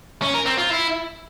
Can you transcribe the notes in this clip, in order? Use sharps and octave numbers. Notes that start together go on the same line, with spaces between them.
C#4
A#4
C4
F4
E4